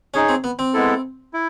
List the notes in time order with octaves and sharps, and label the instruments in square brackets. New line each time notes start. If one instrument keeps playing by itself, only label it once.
[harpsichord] C#4 [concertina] D#4 G#4 C#5
[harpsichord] C4
B3
C4
[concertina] G#3 B3 E4 A4
E4